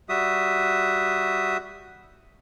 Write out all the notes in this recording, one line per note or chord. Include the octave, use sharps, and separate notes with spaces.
G3 F#4 E5 D#6